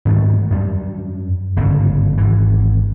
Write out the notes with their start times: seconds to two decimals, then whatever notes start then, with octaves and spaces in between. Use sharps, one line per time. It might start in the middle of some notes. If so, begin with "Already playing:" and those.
0.05 G#2 D#3 G3 A3
0.51 F#2 G3
1.56 G1 D2 G#2 C#3
2.18 G#1 E3